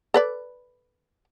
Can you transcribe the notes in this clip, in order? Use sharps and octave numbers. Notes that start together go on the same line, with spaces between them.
A4 B4 D5